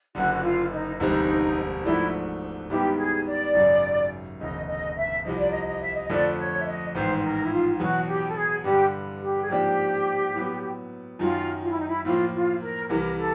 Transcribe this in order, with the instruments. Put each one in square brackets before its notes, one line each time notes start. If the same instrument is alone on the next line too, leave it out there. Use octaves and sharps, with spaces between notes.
[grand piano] F#1 F#2 D3 [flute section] F#4
[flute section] F#4
F4
D#4
[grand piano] E1 D2 D3 G3 C4 [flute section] D#4
[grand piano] G#2 F3 A3 D4 F#4 [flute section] E4
[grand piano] G#2 D#3 G3 B3 E4 [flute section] G4
[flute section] G#4
D5
[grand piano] G#1 F#2 C#3 F#3
[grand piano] E1 D2 C#3 [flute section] D#5
[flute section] D#5
E5
[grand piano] C2 C3 F3 [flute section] D#5
[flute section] D5
D#5
D#5
E5
D#5
[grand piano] F2 D3 F3 A3 [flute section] D5
[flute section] C#5
E5
D#5
[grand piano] A1 G#2 D#3 [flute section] C5
[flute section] A#4
E4
F4
[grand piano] E2 B2 F#3 [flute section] F#4
[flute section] G4
A4
G#4
[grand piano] G2 D3 G3 [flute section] G4
[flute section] G4
G#4
[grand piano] G#2 F3 A#3 D4 [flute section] G4
[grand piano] A2 F#3 B3
[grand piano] F#2 D#3 F#3 [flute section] F4
[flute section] F4
E4
D#4
E4
[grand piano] A2 F3 A#3 [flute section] F4
[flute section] F4
A#4
[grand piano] C2 C3 E3 [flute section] A#4
[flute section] A4